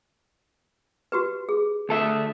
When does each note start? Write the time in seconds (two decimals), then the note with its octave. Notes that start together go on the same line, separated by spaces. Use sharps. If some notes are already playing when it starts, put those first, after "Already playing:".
1.12 F#4 G4 B4
1.49 G#4
1.89 D2 A4 E5